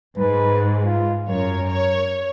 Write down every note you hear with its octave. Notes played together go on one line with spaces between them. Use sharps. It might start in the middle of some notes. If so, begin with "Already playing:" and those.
G#2 B4
F4
F#2 A#4 C#5
C#5